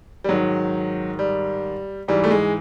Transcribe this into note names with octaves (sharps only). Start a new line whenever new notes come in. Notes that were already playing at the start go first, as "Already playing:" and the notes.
G3
G#2 D#3 F#3
G3
G#2 E3 G3
A3
G#3